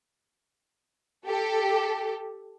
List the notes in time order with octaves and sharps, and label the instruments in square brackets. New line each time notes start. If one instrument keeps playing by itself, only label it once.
[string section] G4 A4